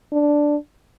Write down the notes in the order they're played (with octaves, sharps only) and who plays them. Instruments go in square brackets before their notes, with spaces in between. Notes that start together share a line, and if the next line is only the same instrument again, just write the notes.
[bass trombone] D4